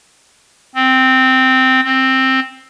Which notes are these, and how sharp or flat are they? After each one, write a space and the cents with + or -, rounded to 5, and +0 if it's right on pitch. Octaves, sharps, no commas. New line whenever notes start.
C4 -5
C4 +10